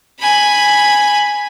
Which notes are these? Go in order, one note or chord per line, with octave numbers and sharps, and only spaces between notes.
G#5 B5